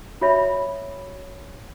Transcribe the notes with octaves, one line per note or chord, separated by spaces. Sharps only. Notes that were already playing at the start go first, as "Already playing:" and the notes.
F4 F#4 C#5 E5 B5